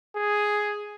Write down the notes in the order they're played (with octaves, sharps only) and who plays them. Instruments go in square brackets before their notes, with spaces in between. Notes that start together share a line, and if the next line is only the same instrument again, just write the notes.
[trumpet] G#4